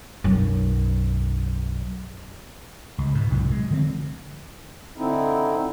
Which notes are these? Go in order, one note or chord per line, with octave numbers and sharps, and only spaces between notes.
B1 F#2
C#2
G#2 B2
C2 F#2 A2
G#3
D3 E3 F3 C4
D3 C4 D#4 E4